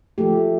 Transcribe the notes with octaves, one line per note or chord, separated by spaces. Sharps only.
F3 A3 G4 A4